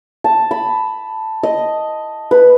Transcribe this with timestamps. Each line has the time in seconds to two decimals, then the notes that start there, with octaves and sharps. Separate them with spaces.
0.24 A5
0.51 B5
1.43 D#5
2.31 B4